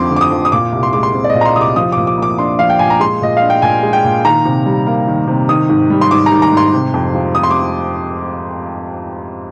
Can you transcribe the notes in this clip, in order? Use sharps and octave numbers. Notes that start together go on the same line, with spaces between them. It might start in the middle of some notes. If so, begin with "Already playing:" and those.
Already playing: F2 D3 F3 C4 C6 D6
D3
D6
D#6
F2
D#6
A#2 D6
C2
C6
G#3 D6
C6
C4
D5
A#2 D#5
A#5
C6
C2 D#6
D6
F3 D#6
A#2 D6
D6
A#3 D6
D4 C6
F3 F5
G5
A#2 G#5
A#5
G#3 C6
A#2 D#5
F5
D4
G5
A#2 G#5
G#3
G5
A#2
D#3 A#5
C3
G3
A#3
D#3
C3
D#3 D#6
G#2
G3
C6
G#2 D6
A#5
D#3
A#5
G#2
C6
C3
F2
F3
C4 D#6
C6
D6